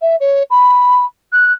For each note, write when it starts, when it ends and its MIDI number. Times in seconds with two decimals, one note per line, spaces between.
0.02 0.16 76
0.20 0.43 73
0.50 1.05 83
1.33 1.52 90